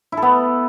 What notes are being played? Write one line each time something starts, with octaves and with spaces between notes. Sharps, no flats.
E4
A4
B3